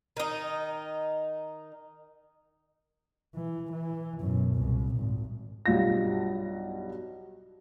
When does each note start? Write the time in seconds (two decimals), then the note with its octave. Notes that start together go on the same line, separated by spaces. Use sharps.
0.17 D#3 D#4
3.35 E3
3.72 E3
4.20 F#2 B2
4.56 C2 A#2
4.97 G#1
5.66 B1 G2 F4 A#6